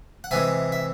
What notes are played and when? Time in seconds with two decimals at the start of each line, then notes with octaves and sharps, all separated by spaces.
0.24 F#5
0.31 C3 E3 G#3 E5 G#5
0.72 E5